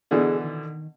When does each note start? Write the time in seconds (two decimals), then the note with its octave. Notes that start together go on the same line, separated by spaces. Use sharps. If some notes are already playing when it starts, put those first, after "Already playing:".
0.11 B2 D3 E3 G#4
0.44 D#3